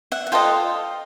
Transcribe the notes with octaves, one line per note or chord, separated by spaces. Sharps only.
E5 F#5
F#5
F4 A4 C5 D#5 F5 G5